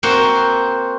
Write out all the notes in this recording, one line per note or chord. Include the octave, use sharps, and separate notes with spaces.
A#3 C4 F#4 C5